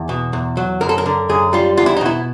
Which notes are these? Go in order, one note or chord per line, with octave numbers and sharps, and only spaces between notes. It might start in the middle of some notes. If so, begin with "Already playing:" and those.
Already playing: E2
B2
E2
F#3
F#2 A#4
A4
A#4
D3
F#2 G#4
G3 F4
E2 F4
E4
D#4
B2 E4